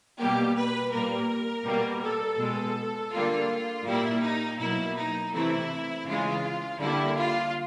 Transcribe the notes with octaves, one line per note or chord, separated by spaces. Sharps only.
B2 G3 A#3 G4
B4
A#2 G3 A#3 A#4
B2 G3 A#3
A4
B2 G#3
D3 G3 A#3 F4
A#2 G3 A#3 E4
D#4
B2 F#3 A#3 E4
D#4
C3 E3 A3 E4
C#3 E3 G#3 F4
D3 G3 A#3 E4
F4